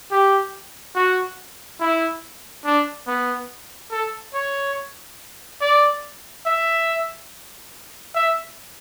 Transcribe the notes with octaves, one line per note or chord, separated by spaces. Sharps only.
G4
F#4
E4
D4
B3
A4
C#5
D5
E5
E5